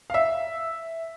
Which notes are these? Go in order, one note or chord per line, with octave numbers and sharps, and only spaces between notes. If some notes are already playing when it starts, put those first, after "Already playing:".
F5
E5